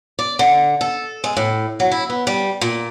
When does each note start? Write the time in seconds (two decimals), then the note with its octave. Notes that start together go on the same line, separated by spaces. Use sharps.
0.19 D5
0.39 D3
0.81 A4
1.24 G#3
1.37 A2
1.80 F#3
1.91 E4
2.10 B3
2.27 G3
2.61 A#2